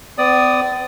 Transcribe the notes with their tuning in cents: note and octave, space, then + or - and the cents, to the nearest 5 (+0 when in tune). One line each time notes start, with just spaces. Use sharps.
C4 -45 D5 +0 D#6 -5